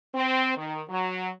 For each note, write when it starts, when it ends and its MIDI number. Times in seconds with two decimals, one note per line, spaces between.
0.15 0.56 60
0.57 0.81 51
0.89 1.30 54